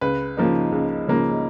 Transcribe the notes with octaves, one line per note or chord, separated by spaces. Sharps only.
C#2 B4
C#3 F3 A#3 D#4
C#2
C#3 F3 A#3 D#4